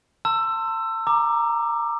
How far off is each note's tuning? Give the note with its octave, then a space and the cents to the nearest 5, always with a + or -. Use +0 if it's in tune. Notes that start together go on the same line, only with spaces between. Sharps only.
A5 +40 C6 +0 E6 +20
A#5 +0 D6 +15